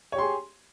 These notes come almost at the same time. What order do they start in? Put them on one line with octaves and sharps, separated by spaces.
C#5 G4 C6 G#4